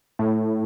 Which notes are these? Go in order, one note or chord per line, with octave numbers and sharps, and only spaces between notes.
A2